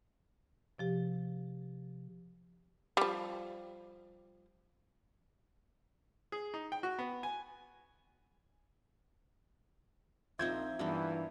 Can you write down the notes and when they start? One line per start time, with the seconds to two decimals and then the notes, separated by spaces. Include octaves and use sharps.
0.78 C3 F3 G4
2.97 F3 G3
6.32 G#4
6.54 D#4
6.72 G5
6.83 F#4
6.98 B3
7.23 G#5
10.39 A#1 F3 C4 D#4 E5 G6 G#6
10.79 G2 E3 G3 A#3 B3